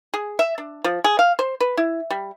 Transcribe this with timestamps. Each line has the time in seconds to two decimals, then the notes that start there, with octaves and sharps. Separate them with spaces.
0.14 G#4
0.39 E5
0.58 D4
0.84 F3
1.04 G#4
1.19 F5
1.39 C5
1.60 B4
1.77 E4
2.10 G3